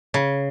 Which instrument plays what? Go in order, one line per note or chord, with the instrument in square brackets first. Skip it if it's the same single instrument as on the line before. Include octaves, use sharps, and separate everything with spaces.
[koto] C#3